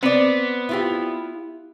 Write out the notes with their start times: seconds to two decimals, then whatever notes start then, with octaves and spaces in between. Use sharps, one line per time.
0.03 B3 C4 D5
0.69 E4 F4 G4